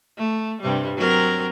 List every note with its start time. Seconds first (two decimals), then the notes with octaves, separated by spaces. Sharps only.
0.18 A3
0.62 G2 C3 G3
0.97 F#3 C4 A#4